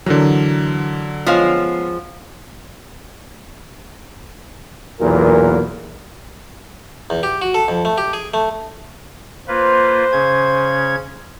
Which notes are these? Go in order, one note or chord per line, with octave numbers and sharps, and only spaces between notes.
D3 E3 F#3 A#4
F3 G#3 B3 C#4 F4 F5
B1 E2 A#2 A#4
E2
G4
F#4
A4
F2
A3
G4
G#4
A3
A#3 F4 B4 C5
C#3 C#4 G#6